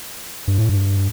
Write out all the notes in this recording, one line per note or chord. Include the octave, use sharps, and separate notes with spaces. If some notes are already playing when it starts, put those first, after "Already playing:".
G2
A2
G2